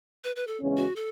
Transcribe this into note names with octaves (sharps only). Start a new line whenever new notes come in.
B4
B4
A4
E2 C#3 G#3 C#4
F#4
A4